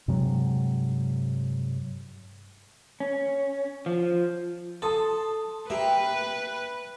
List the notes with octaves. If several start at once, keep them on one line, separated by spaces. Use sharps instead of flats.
G2 C3 F#3 G#3
C#4
F3
A4 A5 C6 D#6
A#3 G4 B4 E5